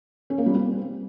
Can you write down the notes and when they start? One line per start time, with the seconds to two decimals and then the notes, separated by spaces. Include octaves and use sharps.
0.30 C#4
0.38 A#3
0.46 G3
0.54 C4